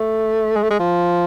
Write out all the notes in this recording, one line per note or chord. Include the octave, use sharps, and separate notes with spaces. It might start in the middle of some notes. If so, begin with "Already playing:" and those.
Already playing: A3
G#3
A3
G#3
F3